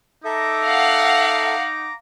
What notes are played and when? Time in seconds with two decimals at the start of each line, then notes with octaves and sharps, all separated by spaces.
0.25 D#4 A4 E5 A#5 D6
0.62 F5 F#5